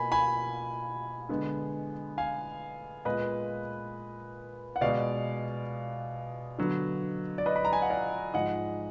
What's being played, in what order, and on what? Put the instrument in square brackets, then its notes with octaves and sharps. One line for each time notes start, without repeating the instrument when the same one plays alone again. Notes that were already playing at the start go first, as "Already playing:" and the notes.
Already playing: [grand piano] B2 A#3 G#5 B5
G#5 B5
D3 G#3 B3
F5 G#5
A#2 G#3 B3 B4 D#5
F#5
B2 G#3 B3 D5 F5
D3 F#3 B3
D5
B4 D#5
B5
A#5
G#5
F#5
D5 F5
G#2 F3 G#3 D#5 F#5